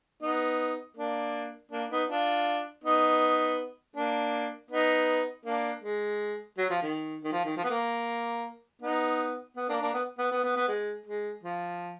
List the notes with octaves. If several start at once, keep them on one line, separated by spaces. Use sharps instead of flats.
B3 D#4
A#3 D4
A#3 D4
B3 D#4
D4 F4
B3 D#4
A#3 D4
B3 D#4
A#3 D4
G#3
F#3
F3
D#3
D#3
F3
D#3
F3
B3
A#3
B3 D#4
B3
A#3 D4
A#3 D4
B3
B3
B3
B3
B3
G#3
G#3
F3